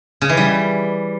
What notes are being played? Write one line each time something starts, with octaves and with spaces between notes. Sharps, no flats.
C#3
E3
G3